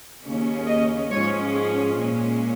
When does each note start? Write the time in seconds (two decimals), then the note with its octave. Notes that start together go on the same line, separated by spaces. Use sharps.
0.23 D#2 C#3 A#3 C#4
0.67 D#5
1.10 G#2 F3 G#3 C#4 C#5
1.53 G#4
1.96 A#2 G#3 C#4